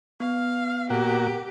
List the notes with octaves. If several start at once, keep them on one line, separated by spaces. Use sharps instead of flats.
B3 F5
A#2 F#4 G4